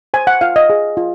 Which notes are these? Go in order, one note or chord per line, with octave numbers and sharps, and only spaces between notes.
C5 G#5
F#5
F4 F5
D#5
G#4
F4